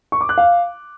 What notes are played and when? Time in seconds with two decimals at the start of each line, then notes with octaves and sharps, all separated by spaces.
0.12 C#6
0.21 D6
0.29 F#6
0.38 F5